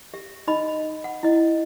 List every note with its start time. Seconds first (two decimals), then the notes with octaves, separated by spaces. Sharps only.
0.14 G4 E5
0.47 D#4 D#5 B5
1.04 F#5
1.23 E4 D#5